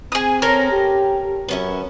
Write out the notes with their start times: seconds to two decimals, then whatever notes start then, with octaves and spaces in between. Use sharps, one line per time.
0.12 C4 G#4 D#6
0.42 C#4 A4 A#4 C5
0.70 G4
1.49 F#2 B3 C#4 E5